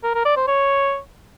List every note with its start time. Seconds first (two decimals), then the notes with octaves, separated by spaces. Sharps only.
0.03 A#4
0.14 A#4
0.25 D5
0.36 C5
0.47 C#5